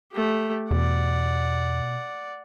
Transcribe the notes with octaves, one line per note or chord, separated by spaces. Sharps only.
A3 G4
E2 B2 D5 F#5